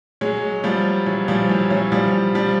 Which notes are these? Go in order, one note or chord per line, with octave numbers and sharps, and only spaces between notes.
F#3 G#3
F3 G3
E3 F#3
F3 G3
E3 F#3
E3 F#3
F3 G3
F3 G3